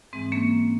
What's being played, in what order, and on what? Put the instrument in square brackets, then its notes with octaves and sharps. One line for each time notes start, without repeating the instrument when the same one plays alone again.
[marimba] G#2 E3 G#3 C4
A#3 C#4